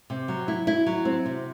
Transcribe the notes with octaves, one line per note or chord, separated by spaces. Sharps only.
C3
F#3
E4
E4
F#3
C4
C3